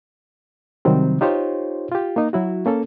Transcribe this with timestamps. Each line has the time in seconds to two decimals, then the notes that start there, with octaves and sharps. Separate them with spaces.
0.85 C3 D#3 F#3 G3 C4
1.21 D#4 F4 G4 C5 C#5
1.92 F4 G4
2.16 A#3 D#4
2.33 F#3 E4 F#4
2.66 A#3 C#4 A4